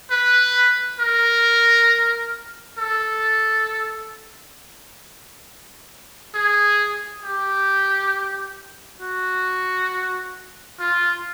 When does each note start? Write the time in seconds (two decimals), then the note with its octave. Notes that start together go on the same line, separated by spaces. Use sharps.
0.11 B4
0.99 A#4
2.78 A4
6.35 G#4
7.23 G4
9.01 F#4
10.80 F4